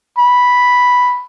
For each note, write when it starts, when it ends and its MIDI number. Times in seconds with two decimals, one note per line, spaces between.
0.19 1.21 83